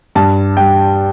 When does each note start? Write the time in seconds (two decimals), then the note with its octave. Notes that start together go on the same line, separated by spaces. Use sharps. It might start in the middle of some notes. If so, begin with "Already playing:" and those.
0.15 G2 A5
0.57 G3 G5